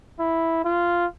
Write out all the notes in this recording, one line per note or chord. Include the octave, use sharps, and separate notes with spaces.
E4
F4